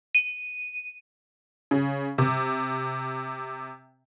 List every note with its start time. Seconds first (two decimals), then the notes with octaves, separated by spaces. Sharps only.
0.15 D#7
1.71 C#3
2.18 C3